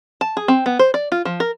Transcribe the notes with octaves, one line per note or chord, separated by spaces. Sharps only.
A5
G#4
C4
B3
C5
D5
F4
F3
A#4